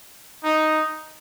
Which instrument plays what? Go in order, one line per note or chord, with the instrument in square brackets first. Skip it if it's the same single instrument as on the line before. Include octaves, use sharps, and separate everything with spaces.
[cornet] D#4